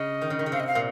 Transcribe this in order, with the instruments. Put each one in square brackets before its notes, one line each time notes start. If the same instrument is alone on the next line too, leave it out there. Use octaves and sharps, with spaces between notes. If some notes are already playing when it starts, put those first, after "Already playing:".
Already playing: [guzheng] C#3 [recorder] D#5
[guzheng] D#3
C#3
D#3
C#3
[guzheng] C3 [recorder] F5
[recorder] D#5
F5
[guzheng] A#2